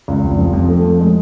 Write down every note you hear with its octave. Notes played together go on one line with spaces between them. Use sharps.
C#2
F1
F3
F2
A3
F2
G#3